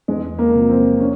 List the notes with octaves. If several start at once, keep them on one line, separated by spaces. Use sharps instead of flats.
E2 G#3
A#3
C3 F3
C4
C#4